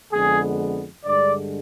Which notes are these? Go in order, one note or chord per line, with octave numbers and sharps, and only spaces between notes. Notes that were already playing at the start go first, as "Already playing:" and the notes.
F2 D3 G#3 B3 G#4
G2 D3 G#3 D5